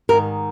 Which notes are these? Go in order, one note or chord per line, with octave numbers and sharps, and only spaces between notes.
G#2 D#3 A#4